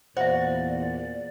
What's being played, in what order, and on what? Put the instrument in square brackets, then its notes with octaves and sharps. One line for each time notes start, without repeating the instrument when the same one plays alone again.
[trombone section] E2 A#2 [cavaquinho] F#4 [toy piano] C5 E5 [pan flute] D5